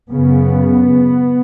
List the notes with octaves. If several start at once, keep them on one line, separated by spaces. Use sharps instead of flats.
F#2 C#3 B3